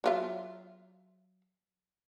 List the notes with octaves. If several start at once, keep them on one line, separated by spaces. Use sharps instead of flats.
F#3 F4 E5